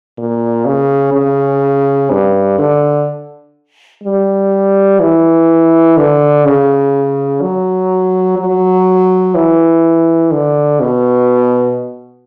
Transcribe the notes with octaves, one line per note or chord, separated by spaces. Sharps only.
A#2
C#3
C#3
G2
D3
G3
E3
D3
C#3
F#3
F#3
E3
D3
B2